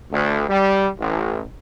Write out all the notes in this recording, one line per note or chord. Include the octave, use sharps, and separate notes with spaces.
D2
G3
A1